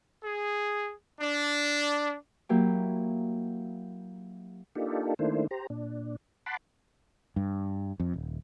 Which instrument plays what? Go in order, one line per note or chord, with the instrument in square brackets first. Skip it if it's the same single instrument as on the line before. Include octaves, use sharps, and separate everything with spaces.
[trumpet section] G#4
D4
[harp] F#3 A#3 E4 G4
[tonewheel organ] A#3 D4 D#4 F4 G4 A4
D#3 A3 A#3 D4 E4 C5
G4 C5 A#5
A#2 D4
F#5 A5 B5 C6 D6
[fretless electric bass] G2
F2
D#1